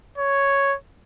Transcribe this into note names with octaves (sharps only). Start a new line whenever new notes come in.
C#5